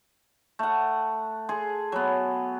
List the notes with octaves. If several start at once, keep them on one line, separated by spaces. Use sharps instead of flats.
A3 F#5
G#4 A4 C6
F#3 B3